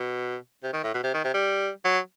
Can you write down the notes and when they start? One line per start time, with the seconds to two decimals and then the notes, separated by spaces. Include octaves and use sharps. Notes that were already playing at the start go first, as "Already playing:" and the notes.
Already playing: B2
0.63 C3
0.73 D#3
0.83 A2
0.94 B2
1.03 C3
1.14 D#3
1.24 C3
1.34 G3
1.84 F#3